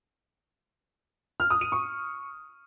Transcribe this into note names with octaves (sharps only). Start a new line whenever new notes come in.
F6
D#6
D#7
C#6